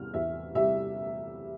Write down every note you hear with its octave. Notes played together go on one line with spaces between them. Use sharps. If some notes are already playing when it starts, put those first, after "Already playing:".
Already playing: E2 C3 G3 F6
E2 E5
C3 G3 E5